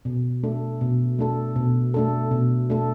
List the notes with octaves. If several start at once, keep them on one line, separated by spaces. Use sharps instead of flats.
B2
A3 D4 A4
B2
A3 D4 A4
B2
A3 D4 A4
B2
A3 D4 A4